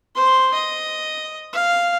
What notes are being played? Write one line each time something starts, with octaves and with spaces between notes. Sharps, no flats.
C5 C6
D#5
F5